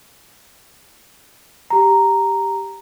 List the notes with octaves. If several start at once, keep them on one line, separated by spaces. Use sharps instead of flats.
G4 A#5